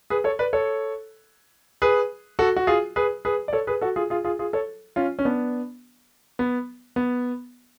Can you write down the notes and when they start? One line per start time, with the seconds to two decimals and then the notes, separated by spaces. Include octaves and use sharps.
0.10 G#4 B4
0.24 A4 C#5
0.39 B4 D5
0.53 A4 C#5
1.82 G#4 B4
2.39 F#4 A4
2.56 F#4
2.67 F4 G#4
2.96 G#4 B4
3.25 G#4 B4
3.48 D5
3.53 A4 C#5
3.67 G#4 B4
3.81 F#4 A4
3.96 F4 G#4
4.10 F4 G#4
4.24 F4 G#4
4.39 F4 G#4
4.53 A4 C#5
4.96 C#4 F4
5.19 C#4
5.25 B3 D4
6.39 B3
6.96 B3